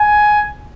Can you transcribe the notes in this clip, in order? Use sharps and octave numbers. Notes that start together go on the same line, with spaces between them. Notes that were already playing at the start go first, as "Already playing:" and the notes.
Already playing: G#5